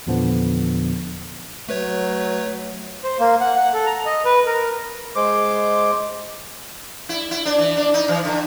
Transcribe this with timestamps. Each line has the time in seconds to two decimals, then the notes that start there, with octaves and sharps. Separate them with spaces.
0.07 E2 A#2 D3 F3 B3 D4
1.69 F#3 A3 B4 C#5
3.04 C5
3.20 A#3
3.40 F#5
3.57 F#5
3.74 A4
3.86 A#5
4.05 D#5
4.25 B4
4.47 A#4
5.15 G#3 C5 D6
7.09 E4
7.31 E4
7.45 D4
7.58 E3
7.77 D4
7.94 D#4
8.08 E3
8.25 D3